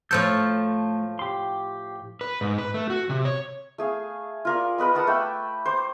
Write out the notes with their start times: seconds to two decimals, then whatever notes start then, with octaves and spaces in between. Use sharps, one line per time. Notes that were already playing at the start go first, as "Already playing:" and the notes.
0.11 A2 F3 A3 A4 F6 G6
1.19 G4 C6
2.21 B4
2.41 G#2
2.58 B4
2.74 A3
2.90 F#4
3.09 C3
3.25 C#5
3.78 A3 G#4 F5
4.45 F4 A#4 D5
4.78 A#4 B4 D#5 B5
4.95 F#5 A5 D#6 E6
5.07 A3 G5 D6
5.65 C5 D6